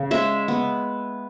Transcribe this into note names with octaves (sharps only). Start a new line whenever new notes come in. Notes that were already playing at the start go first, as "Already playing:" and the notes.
Already playing: C#3
G#3 E5
B3